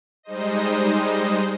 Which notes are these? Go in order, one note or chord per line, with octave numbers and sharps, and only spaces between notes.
G3 G#3 D#4 C5 D#5